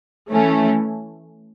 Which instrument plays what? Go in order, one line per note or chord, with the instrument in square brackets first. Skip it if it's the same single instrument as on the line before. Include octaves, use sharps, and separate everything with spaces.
[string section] E3 A3 C#4